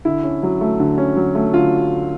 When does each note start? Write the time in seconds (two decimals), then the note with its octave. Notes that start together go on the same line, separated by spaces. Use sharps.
0.05 D3 E4
0.23 C#4
0.43 F#3
0.61 A3
0.80 D3
0.98 C#4
1.16 F#3
1.35 A3
1.54 D3 F4